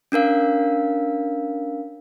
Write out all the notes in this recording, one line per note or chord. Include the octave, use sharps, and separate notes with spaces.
C#4 D4 A#4 F5